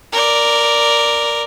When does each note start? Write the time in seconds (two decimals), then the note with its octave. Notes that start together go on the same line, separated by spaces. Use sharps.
0.12 A#4 D5